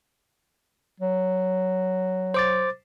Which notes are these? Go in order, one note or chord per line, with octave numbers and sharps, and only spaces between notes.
F#3
C5 D6 A6